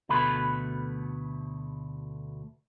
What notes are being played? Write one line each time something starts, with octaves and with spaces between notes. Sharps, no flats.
D2 B2 A3 B4 B5